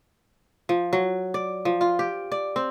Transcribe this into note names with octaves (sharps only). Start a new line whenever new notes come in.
F3
F#3
D5
F3
F4
G4
D5
C4